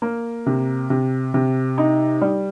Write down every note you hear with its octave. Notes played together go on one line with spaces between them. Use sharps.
A#3
C3
C3
C3
D#4
G3